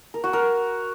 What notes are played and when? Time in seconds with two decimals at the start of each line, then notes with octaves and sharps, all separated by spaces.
0.14 A#4
0.24 F#4
0.33 A#4